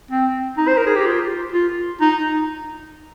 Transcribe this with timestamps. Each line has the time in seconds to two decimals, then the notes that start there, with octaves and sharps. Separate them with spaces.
0.11 C4
0.57 D#4
0.68 C5
0.77 A#4
0.86 G#4
0.96 G4
1.06 F4
1.52 F4
2.01 D#4